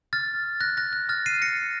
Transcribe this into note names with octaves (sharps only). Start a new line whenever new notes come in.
F6 A6
F#6 A#6
F#6 A#6
F#6
F6 A6
C7 D#7
A#6 C#7